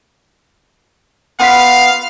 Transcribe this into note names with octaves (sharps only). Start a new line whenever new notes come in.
B3 F4 F5 B5